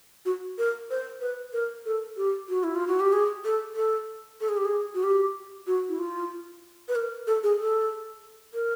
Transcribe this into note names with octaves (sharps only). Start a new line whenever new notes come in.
F#4
A#4
C5
B4
A#4
A4
G4
F#4
E4
F4
F#4
G4
G#4
A4
A4
A4
G#4
G4
G#4
F#4
G4
F#4
E4
F4
B4
A#4
A4
G#4
A4
A#4